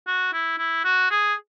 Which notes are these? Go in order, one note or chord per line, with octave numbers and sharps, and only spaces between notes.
F#4
E4
E4
F#4
G#4